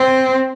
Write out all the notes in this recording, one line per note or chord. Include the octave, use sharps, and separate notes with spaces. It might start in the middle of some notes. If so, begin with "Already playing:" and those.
Already playing: C4